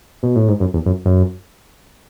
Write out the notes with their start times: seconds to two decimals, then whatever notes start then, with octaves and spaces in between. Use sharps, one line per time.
0.23 B2
0.36 A2
0.48 G#2
0.60 F#2
0.74 E2
0.86 F#2
1.05 F#2